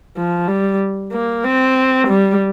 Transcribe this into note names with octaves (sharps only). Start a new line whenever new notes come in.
F3
G3
A#3
C4
G3